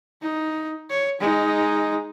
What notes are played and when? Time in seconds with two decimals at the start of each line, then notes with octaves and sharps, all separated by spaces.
0.22 D#4
0.90 C#5
1.20 G#3 D#4